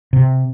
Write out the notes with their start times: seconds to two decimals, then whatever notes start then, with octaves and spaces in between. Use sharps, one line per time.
0.13 C3